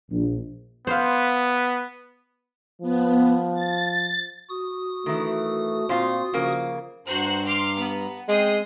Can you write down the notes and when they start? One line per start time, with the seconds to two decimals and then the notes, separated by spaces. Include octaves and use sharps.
0.10 A#1
0.87 B3 C5 F5
2.82 F3 B3
3.54 A6
4.49 F#4 D#6
5.06 D#3 E3 A3
5.89 A#2 C4 F4
6.34 C#3 F3 A#3
7.07 G2 F#4 C5 A#5 F#6
7.45 C6 D6 F6
7.78 B3
8.28 G#3 C4 D#6 G6 C7